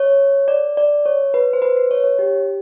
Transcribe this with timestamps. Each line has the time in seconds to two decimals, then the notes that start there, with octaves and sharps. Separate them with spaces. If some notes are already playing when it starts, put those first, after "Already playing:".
Already playing: C#5
0.48 D5
0.77 D5
1.06 C#5
1.34 B4
1.53 C5
1.62 B4
1.77 B4
1.91 C#5
2.04 C#5
2.19 G4